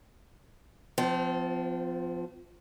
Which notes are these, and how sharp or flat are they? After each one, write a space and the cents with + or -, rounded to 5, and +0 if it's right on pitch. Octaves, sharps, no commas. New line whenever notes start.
F3 +0 C4 -40